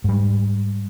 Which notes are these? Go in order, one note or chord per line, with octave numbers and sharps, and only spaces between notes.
G#2 G3